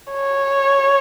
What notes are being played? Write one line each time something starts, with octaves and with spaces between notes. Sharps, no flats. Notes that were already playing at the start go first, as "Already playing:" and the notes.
C#5